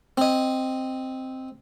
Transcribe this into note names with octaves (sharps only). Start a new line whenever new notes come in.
C4 D#5